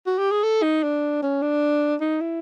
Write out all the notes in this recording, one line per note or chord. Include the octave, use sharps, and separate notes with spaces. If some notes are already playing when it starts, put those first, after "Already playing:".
F#4
G4
G#4
A4
D#4
D4
C#4
D4
D#4
E4